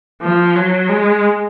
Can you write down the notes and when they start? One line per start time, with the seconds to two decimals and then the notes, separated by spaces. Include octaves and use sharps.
0.22 F3
0.55 F#3
0.89 G#3